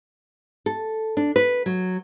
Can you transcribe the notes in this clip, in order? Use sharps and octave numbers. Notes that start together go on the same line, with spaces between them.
A4
D4
B4
F#3